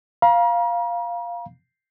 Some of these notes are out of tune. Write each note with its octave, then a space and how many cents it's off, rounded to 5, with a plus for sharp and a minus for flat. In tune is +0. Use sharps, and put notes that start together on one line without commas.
F5 +0 A#5 +40